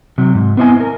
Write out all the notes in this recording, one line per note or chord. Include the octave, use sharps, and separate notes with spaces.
C3 F#3
G#2
B3 C4 E4 C#5 D#5 G#5
A#4